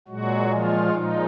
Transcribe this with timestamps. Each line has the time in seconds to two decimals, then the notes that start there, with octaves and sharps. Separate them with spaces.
0.08 A#2 F#3 G#3 F#4
0.51 F3 F4
0.93 A#2 F3 G#3 D#4